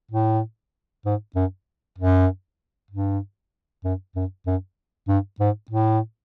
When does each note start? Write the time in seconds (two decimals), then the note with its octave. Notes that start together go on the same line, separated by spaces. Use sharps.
0.12 A2
1.05 G#2
1.35 F#2
1.98 F#2
2.91 G2
3.84 F#2
4.16 F#2
4.47 F#2
5.08 G2
5.40 G#2
5.70 A2